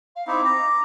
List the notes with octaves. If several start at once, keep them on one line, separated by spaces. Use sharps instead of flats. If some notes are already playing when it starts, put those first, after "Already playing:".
F5
C4 D#4 E4 D6
A#5